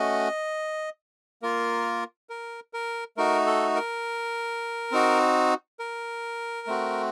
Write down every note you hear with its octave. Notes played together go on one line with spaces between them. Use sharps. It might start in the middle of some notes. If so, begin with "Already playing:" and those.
Already playing: A3 C#4 F#4 D#5
A#3 F4 A#4
A#4
A#4
A3 D#4 F#4 A#4
A4
A#4
C4 D#4 F#4
A#4
A3 C4 F#4